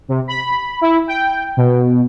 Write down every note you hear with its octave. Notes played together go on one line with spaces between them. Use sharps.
C3
B5
E4
G5
B2